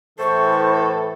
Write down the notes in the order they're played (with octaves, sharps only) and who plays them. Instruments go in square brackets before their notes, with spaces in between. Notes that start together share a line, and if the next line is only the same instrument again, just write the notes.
[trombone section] A2 E3 [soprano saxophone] A4 [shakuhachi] C5 [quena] C#6